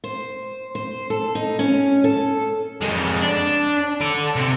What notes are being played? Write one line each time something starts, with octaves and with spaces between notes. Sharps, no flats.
C5
C5
A4
D#4
C#4
A4
F2 G#3
D4
A4 D5
C3 C4